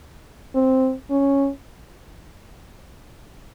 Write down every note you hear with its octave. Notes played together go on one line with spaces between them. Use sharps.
C4
C#4